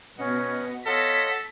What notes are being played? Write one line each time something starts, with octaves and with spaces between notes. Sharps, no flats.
B2 C#4 B4 D#5 F#5
F4 A4 C#5 D#5 F#5 A#6 B6